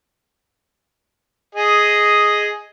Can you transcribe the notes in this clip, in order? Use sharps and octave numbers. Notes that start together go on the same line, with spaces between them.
G#4 D#5